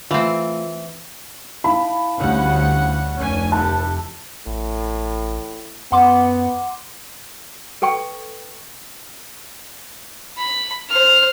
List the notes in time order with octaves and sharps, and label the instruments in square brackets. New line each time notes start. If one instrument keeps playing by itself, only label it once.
[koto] E3 C4 [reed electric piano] A3 F4
[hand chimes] E4 F5 A5 [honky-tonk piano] B5
[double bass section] D2 [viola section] G3 C#4 F#5
[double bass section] F1 [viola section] C#4 D4 G#5
[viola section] E4 G4 A4 [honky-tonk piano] A5 [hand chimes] F#6
[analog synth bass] A1 [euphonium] A2
[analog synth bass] F#2 [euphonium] B3 [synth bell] F#5 C6 D6
[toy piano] A4 B4 G5 C#6
[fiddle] B5
C5 F6